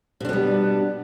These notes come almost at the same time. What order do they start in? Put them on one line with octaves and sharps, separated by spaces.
B2 D4 B3 G3